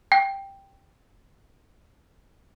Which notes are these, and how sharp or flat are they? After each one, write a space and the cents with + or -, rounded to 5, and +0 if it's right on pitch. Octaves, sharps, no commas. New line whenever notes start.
G5 +5